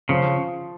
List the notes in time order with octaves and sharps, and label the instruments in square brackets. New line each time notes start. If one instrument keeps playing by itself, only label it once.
[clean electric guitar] C#3 [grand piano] F3